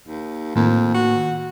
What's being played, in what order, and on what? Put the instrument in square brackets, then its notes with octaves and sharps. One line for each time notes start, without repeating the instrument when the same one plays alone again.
[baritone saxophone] D#2
[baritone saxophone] F2 [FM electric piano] A2 D#3 A#3
[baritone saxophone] F#4